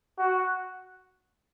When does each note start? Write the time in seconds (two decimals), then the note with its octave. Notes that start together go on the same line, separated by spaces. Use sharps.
0.18 F#4